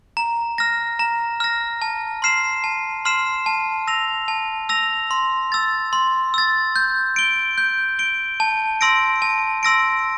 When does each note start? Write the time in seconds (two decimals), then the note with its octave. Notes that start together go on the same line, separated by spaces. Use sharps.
0.17 A#5
0.58 F6 A#6
0.99 A#5
1.40 F6 A#6
1.82 A5
2.22 C6 F6 C7 E7
2.64 A5
3.05 C6 F6 C7 E7
3.46 A5
3.87 E6 A#6 F7
4.28 A5
4.69 E6 A#6 F7
5.11 C6
5.52 E6 A6
5.93 C6
6.34 E6 A6
6.76 G6
7.16 D7 G7
7.58 G6
7.99 D7 G7
8.40 A5
8.81 C6 E6 A#6 D7
9.22 A5
9.63 C6 E6 A#6 D7